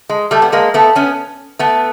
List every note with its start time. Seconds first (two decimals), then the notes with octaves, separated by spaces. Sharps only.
0.09 G#3
0.31 G3 A3
0.42 B3
0.52 G#3 A#3
0.74 A3 B3
0.95 B3 C#4
1.59 A3 B3